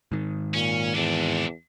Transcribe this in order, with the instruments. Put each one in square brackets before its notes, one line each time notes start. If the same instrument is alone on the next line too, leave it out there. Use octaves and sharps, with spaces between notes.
[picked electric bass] G#2 D#3
[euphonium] A#2 [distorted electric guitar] C#4
[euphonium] E2 [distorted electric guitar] C3 D4